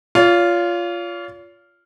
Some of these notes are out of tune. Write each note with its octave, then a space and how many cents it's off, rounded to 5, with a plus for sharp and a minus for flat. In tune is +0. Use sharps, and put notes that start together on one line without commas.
F4 -5 C#5 +45